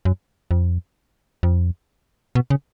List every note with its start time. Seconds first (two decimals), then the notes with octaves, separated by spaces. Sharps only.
0.05 F#2
0.51 F2
1.43 F2
2.35 B2
2.50 C#3